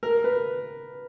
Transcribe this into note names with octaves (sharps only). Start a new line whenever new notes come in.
A#4
B4